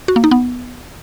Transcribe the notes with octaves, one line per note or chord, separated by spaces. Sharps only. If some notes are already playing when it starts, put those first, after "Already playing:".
F#4
A#3
D#4
B3